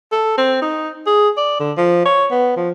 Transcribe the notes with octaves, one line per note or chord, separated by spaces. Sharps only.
A4
C4
D#4
G#4
D5
D3
F3
C#5
B3
F3